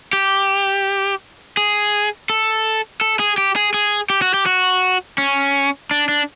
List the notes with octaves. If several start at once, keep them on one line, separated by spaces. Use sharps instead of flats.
G4
G#4
A4
A4
G#4
G4
G#4
G#4
G4
F#4
G4
F#4
C#4
D4
D4